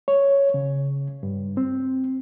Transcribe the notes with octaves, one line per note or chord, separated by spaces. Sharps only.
C#5
C#3
G2
C4